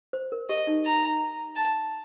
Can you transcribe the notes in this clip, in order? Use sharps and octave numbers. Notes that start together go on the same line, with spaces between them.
C5
A#4
G4 D#5
D#4
A#5
A5